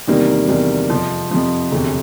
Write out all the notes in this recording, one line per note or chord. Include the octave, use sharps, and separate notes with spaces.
E2 C3 D#3 G3 A#3
E2 C3 D#3 G3 A#3
F2 C3 F3
F2 C3 F3
E1 D2 C3